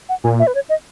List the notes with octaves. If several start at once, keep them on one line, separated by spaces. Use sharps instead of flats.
F#5
A#2 G#5
E5
B4
C#5
D#5